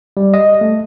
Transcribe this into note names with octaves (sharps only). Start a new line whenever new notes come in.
G3
D#5
A3